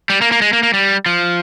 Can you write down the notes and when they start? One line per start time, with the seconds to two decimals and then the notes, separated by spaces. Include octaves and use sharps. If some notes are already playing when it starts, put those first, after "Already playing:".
0.10 G3
0.21 A#3
0.32 A#3
0.42 G#3
0.53 A#3
0.63 A#3
0.74 G3
1.06 F3